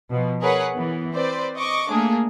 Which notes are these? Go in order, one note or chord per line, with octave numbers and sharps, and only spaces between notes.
B2 F3
G#4 A#4 B4 C#5 F#5
E3 B3
C4 B4 C5 D5
D#5 C#6 D6
A3 A#3 D4 G#4